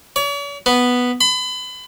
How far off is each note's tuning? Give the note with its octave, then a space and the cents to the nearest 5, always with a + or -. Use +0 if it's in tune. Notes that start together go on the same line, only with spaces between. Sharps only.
C#5 +45
B3 +0
B5 +35